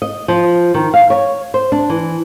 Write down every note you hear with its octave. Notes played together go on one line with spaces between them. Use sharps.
D#5
F3
D#3
F5
C#5
C5
D4
E3